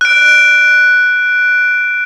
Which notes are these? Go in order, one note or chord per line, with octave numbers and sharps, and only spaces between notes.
F#6 D7